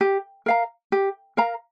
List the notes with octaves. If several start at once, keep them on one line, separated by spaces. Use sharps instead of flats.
G4
A#4 F5 A#5
G4
A#4 F5 A#5